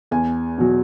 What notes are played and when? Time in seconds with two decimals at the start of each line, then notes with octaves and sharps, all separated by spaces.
0.11 E2 G#5
0.58 B2 F#3